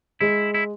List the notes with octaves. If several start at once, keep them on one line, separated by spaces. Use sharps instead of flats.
G#3 E4
E4